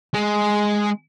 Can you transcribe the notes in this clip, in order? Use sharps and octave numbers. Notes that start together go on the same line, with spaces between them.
G#3